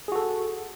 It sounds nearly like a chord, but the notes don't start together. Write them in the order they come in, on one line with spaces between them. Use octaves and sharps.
G#4 F#4 A4